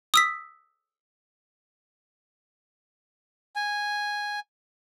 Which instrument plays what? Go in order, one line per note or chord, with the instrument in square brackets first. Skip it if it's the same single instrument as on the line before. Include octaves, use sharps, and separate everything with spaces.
[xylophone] D#6 E6 B6
[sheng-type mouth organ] G#5